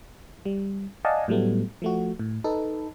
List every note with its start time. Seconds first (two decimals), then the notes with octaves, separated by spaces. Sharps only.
0.45 G3
1.05 D5 D#5 F5 F#5 G#5 A5
1.28 A2 F#3 G3 A3 B3
1.82 F3 A3 F#4
2.20 A2
2.44 D#4 A4 B4